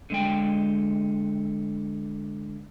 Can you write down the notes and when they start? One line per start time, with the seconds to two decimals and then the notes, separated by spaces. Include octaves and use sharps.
0.10 D3 G#3 G5